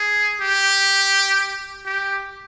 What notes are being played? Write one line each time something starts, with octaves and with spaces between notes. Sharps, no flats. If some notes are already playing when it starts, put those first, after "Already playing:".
Already playing: G#4
G4
G4